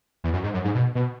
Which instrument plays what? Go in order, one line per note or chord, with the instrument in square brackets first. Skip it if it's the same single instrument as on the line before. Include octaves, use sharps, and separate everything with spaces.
[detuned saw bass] E2
F#2
G#2
F#2
G#2
B2
B2